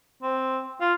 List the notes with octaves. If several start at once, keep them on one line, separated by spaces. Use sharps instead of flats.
C4
F4